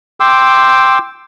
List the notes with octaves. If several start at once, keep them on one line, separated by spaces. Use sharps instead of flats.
G5 C6 D6 E6